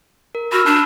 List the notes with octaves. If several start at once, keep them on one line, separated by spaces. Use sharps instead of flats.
A#4
F#4 B5 E6 F6
D4 A5